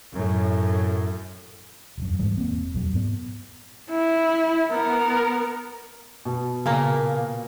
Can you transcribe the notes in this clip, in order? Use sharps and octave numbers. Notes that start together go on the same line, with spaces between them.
F#2 A2
E1 F#2
G#2 E3 G3 G#3
E1 A#3 C4
E2 B2 F#3
G#2 B3
E4
B3 A#4
B2
A#2 C#3 A#3